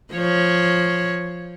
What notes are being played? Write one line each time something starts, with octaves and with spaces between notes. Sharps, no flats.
F3 C#5